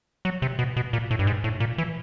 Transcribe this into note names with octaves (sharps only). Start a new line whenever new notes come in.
F#3
C3
B2
B2
A#2
A2
G2
G#2
A2
A#2
E3